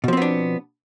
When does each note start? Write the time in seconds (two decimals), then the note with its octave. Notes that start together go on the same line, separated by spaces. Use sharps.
0.04 B2
0.08 F3
0.13 C4
0.17 B3
0.22 D4